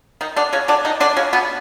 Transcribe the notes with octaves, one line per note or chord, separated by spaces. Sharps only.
D#3 D#4
D3 D4
C#3 C#4
D3 D4
D#3 D#4
D3 D4
C#3 C#4
B2 B3